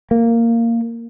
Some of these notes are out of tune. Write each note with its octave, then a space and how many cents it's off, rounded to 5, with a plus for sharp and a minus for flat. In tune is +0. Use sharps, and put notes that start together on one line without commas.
A#3 -10